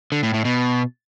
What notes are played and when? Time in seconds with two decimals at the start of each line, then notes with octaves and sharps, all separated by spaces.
0.12 D3
0.23 A2
0.34 A2
0.45 B2